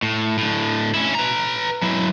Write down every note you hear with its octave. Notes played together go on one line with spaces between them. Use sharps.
A2
A2 D3
C#4 E4
B4 A#5
F#3 E4